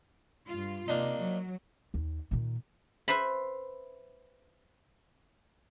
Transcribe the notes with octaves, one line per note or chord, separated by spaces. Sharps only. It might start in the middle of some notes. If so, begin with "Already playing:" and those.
G2 F4
C3 A#3 D4 D#4
F#3
D#2
A#2 D#3
B4 C5 E5 B5